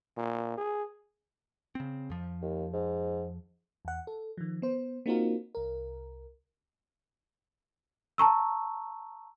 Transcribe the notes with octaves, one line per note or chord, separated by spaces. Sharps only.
A#2
G#4
C#3 C4
F2 F3
D#2
G#2
E2 F#5
A4
D#3 F3
B3 C5
A#3 C4 D#4 F4 F#4 A#4
C2 A#4
A5 A#5 C#6 E6